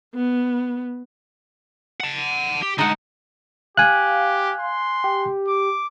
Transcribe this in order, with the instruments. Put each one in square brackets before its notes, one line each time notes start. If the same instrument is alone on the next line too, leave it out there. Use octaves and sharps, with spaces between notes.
[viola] B3
[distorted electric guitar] F#5 A5
G4
[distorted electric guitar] D3 G#3 [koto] D#4 F#5
[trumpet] G4 [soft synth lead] F5 [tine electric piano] G#5 F#6
[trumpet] C6
[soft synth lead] G4
[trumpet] D6